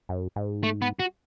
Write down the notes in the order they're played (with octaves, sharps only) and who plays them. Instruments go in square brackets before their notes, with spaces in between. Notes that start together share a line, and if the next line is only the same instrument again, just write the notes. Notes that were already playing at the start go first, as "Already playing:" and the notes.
[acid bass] F#2
G#2
[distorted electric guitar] A3
B3
F#4